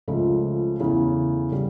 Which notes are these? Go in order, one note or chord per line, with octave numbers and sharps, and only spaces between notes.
C#2 C#3 F3 A3
E2 C#3 E3 A3
C#3 G3